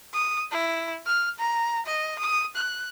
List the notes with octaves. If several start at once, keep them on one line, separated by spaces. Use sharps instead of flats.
D#6
E4
F6
A#5
D#5
D#6
F#6